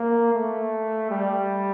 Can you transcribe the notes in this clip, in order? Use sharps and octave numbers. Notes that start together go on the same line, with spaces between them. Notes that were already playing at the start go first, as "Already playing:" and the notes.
Already playing: A#3
A3
G3